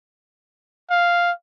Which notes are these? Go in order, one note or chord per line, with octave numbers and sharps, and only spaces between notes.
F5